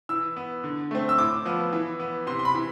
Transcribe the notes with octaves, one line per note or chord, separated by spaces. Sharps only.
E3 E6
B3
D3
A3 C4
E6
A2 D6
F3 B3
E3
B3
C3 C6
C6
B5
E3